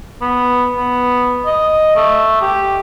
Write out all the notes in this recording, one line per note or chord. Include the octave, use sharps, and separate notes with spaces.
B3
B3
D#5
A3
G4